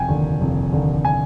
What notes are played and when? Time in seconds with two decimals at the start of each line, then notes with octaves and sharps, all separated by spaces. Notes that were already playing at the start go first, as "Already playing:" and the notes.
Already playing: F1 G5 G#5
0.08 D#2 D3
0.41 F1
0.72 D#2 D3
1.05 G#5